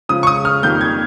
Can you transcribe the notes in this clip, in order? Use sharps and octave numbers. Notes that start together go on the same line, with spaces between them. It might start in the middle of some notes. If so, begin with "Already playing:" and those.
C#3 F3 G#3 D#6
C#6
D#6
F6
F2 D#3 G3 A#3 G6
G#6